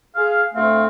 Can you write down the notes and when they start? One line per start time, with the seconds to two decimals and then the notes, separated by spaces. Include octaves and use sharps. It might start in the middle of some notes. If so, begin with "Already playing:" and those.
0.15 G#4 F5
0.54 D2 A3 C4 F5